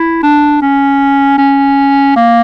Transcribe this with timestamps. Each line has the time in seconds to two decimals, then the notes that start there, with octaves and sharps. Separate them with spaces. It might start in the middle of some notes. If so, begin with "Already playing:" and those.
Already playing: E4
0.23 D4
0.62 C#4
1.38 C#4
2.16 A#3